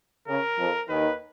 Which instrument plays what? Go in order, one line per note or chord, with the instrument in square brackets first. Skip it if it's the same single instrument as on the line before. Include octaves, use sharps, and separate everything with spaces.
[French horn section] C#3 [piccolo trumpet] A#4
[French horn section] F2 F3
[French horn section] D#2 D#3 [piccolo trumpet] B4